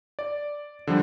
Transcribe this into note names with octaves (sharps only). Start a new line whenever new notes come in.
D5
D3 F3 G3